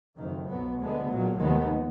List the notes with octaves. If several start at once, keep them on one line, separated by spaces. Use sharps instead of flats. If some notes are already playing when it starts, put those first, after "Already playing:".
F#1 F2 D#3
B1 B2 F#3 B3
D2 D3 G#3 B3
A#1 A#2 F#3
F1 D#2 D#3 G#3 B3